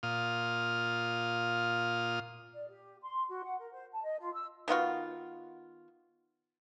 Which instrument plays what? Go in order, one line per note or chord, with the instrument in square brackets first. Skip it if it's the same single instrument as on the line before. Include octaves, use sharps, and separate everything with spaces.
[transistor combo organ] A#2 F4 D#6 F6
[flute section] D5
G4
C6
F#4
F#5
A#4
C5
A5
D#5
F4
E6
[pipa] D#3 B3 F4 F#4